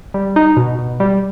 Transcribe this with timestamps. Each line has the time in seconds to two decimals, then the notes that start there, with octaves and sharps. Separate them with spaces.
0.14 G3
0.36 D#4
0.57 B2
0.79 B2
1.00 G3